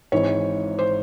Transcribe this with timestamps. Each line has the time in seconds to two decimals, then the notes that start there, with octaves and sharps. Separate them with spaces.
0.12 G#1 G#2 E3 C#5
0.79 C5